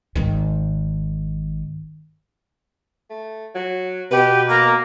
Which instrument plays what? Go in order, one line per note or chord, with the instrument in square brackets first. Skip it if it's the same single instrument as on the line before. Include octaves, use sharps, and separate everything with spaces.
[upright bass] G#1 D#3
[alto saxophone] A3
F#3
[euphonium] B2 [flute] G4 [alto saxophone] B4
[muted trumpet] A#3 [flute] A#4